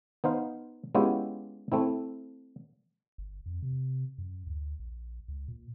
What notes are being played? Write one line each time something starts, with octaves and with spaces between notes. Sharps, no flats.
B3 D#4 C5 F5
G#3 B3 C#4 E4 F4 G4
A3 C4 E4
G1
F2
C3
F#2
D2
A#1
C#2
A#2